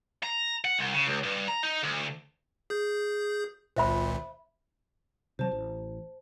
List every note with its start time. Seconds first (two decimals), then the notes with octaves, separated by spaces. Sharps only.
0.23 A#5
0.65 F#5
0.79 C2
0.94 C#3
1.07 C#2
1.23 G2
1.48 A#5
1.63 D#4
1.83 D2
2.70 G#4 G6
3.76 G#1 C#2 A#2 C5 E5 B5
5.39 C3 F#3 C5 A5
5.51 A1